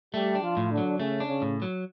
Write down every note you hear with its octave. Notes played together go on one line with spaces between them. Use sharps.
G3 A3 G4
D4
F3 F4
A2
D3 D4
F#3
C#3 A3 C#4
D4
C#3 C#4
A2
F#3